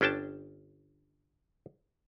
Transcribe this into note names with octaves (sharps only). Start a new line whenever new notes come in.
G1 C#4 D4 G5 A5